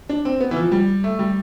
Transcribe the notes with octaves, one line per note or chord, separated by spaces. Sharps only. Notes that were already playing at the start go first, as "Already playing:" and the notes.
D4
C4
B3
E3
F3
G3
A3
G3